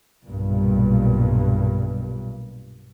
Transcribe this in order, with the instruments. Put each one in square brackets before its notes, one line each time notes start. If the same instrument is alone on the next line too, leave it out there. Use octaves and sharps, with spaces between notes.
[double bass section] B1 G2 A#2